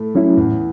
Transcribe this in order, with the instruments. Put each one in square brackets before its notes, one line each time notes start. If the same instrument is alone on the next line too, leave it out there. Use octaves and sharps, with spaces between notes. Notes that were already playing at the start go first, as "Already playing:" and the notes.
Already playing: [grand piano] A2 A3
[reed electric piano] F#3 C#4 E4
[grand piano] E2 E3 [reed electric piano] A2